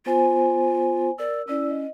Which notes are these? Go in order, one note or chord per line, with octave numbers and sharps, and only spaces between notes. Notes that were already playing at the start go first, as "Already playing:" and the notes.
B3 F4 C5 G#5
A#4 D5 E6
C#4 E4 D5 E6
D#5